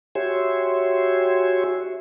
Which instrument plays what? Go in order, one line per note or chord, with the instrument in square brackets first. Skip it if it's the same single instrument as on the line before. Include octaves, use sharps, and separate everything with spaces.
[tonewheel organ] F#4 G4 C#5 E5 G#5 C6